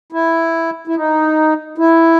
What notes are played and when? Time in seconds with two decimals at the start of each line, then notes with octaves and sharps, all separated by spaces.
0.12 E4
0.87 E4
0.96 D#4
1.78 E4